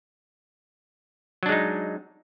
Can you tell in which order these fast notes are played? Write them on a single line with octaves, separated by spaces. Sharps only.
F#3 D4 G#3 D#4